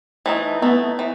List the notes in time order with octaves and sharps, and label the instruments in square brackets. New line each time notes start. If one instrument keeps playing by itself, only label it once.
[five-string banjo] E3 A3 D#4
[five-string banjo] E3 A3 D#4 [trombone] B3
[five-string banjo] E3